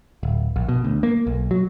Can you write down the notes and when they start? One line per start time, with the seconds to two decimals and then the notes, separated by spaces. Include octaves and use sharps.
0.23 D1
0.56 A#1
0.69 B2
0.84 D2
1.03 A#3
1.27 B1
1.51 F#3